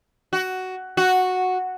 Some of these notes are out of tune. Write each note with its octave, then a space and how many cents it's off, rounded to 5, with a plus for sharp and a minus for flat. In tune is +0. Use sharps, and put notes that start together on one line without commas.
F#4 +10
F#4 -5